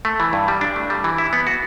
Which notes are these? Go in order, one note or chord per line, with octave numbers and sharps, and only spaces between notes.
A3
E3
G2
G3
D4
A3
G3
E3
E4
B3
F#4